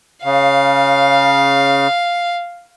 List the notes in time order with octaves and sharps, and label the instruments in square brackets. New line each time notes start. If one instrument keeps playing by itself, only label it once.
[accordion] C#3 [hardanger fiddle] F5